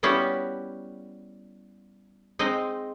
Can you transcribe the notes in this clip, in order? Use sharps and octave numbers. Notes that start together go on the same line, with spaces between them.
G3 B3 C#4 E4 F#4 G4
G#3 C4 D#4 D#5